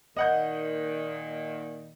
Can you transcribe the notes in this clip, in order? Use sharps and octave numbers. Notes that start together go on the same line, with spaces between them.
A#2 D#3 D#5 F#5 G6